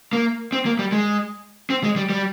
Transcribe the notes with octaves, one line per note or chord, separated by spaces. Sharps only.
A#3
C4
A#3
G3
G#3
C4
G#3
G3
G3